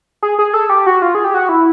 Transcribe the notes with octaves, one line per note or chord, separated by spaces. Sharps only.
G#4
G#4
A4
G4
F#4
F4
G#4
G4
F#4
E4